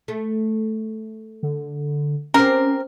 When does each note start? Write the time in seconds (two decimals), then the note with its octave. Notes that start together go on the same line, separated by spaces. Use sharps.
0.08 A3
1.43 D3
2.34 C4 C#4 G4 A#4